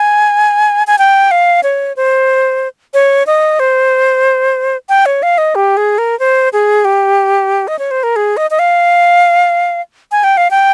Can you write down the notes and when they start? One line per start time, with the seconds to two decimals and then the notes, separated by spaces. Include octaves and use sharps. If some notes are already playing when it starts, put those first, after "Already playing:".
Already playing: G#5
0.87 G#5
0.98 G5
1.31 F5
1.63 C#5
1.97 C5
2.94 C#5
3.27 D#5
3.60 C5
4.89 G5
5.06 C#5
5.23 F5
5.38 D#5
5.55 G4
5.77 G#4
5.98 A#4
6.19 C5
6.53 G#4
6.85 G4
7.68 D#5
7.79 C#5
7.91 C5
8.03 A#4
8.16 G#4
8.37 D#5
8.51 D#5
8.59 F5
10.12 G#5
10.24 G5
10.37 F5
10.51 G5